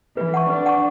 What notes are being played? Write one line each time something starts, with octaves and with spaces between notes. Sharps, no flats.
E3 B4
F#5 A5 C#6
D4 B4
F#5 A5 C#6